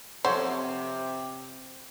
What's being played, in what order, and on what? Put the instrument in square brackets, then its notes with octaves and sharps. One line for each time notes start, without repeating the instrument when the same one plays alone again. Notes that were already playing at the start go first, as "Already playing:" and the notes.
[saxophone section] C3 [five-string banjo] F3 C4 F#5 [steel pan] A4 C#5 [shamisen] C5